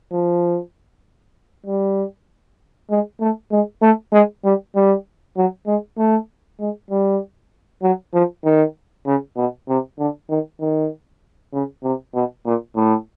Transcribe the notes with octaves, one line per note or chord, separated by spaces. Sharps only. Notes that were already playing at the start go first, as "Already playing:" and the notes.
F3
G3
G#3
A3
G#3
A3
G#3
G3
G3
F#3
G#3
A3
G#3
G3
F#3
F3
D#3
C#3
B2
C3
D3
D#3
D#3
C#3
C3
B2
A#2
A2